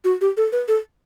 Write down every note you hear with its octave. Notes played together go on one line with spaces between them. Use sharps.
F#4
G4
A4
B4
A4